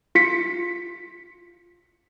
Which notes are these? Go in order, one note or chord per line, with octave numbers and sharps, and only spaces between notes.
F4 B6 C#7